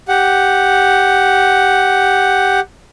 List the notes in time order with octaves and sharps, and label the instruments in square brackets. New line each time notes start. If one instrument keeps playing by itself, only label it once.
[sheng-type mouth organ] G4 F#5